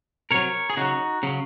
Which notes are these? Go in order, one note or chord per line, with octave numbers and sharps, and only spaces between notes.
C3 F#3 A#4 C#5
G#4
C#3 F#3 D#4 F#4
C#3 F#3